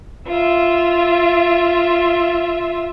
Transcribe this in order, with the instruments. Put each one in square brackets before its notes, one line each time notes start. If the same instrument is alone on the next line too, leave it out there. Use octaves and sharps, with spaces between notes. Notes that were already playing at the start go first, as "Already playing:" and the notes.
[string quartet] F4 E5